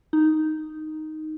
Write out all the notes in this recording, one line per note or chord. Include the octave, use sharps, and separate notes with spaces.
D#4